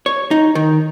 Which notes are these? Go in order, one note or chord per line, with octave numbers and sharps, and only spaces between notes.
C#5
D#4
D#3